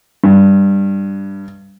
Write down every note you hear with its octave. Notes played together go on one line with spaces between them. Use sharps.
G2